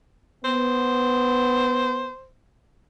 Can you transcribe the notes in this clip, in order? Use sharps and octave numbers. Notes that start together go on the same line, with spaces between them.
B3 C5